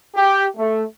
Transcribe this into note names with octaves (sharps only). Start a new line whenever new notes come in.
G4
A3